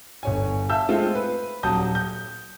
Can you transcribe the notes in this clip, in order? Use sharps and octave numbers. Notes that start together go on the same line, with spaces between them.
G1 C#5 G#5
E5 F5 A5 E6 G6
G#3 A3 C4 F4
B4
D#1 F#3 A5 D#6 G6
G6